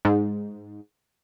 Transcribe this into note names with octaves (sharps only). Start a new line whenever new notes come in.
G#2